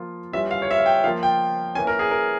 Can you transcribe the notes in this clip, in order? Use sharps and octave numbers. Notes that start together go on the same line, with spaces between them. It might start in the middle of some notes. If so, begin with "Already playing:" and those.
Already playing: F3 A#3 F4
E3 G3 C#4 F4 E5
F5
C#5
E5
F5
G5
F3 A#3 F4 F5
G5
E3 A#3 C#4 G#5
A#4
G#4
A#4